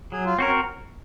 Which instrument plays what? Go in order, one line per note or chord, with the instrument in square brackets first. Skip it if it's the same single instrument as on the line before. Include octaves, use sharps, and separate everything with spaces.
[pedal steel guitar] F#3 [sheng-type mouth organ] G#4
[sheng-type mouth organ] F4
[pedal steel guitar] C4 F#4 A#4 [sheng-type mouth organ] C#4